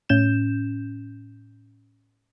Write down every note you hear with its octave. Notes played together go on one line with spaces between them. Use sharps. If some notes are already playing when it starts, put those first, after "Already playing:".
A2 C#4 G6 E7